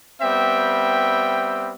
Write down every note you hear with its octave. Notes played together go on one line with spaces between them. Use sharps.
G3 B3 C4 E5 G5